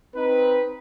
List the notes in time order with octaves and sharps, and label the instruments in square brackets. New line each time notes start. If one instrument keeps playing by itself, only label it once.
[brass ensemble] C4 D#4 B4